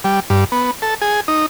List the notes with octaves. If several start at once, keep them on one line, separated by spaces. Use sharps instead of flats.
G3
G2
B3
A4
G#4
D#4